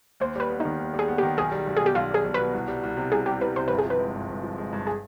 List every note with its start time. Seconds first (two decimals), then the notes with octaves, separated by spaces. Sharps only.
0.20 D#2 C5
0.35 G3 B4
0.50 B3
0.60 D#3 D#4
0.79 D#2
0.94 G3
0.99 G#4
1.08 B3
1.18 D#3 G4
1.37 B1 G#4
1.52 G3
1.67 B1
1.77 B2 G#4
1.86 G4
1.95 B1 F4
2.11 G3 G#4
2.24 B1
2.34 B2 B4
2.53 C2
2.68 G3
2.83 C2
2.97 C3
3.12 C2 G#4
3.26 G3 G4
3.41 C2 B4
3.56 C3 C5
3.68 G1 B4
3.79 G#4
3.85 F3
3.90 B4
3.99 G#3
4.14 G2
4.29 G1
4.43 F3
4.58 G#3
4.73 G2
4.87 G#4